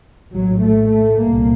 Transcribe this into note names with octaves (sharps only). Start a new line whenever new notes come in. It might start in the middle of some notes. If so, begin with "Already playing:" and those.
A#1 A2 F#3
A3
A3
C2 A#2 A#3